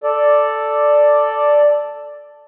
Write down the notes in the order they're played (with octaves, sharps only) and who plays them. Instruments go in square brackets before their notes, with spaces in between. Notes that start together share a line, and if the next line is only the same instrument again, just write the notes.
[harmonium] A4 D5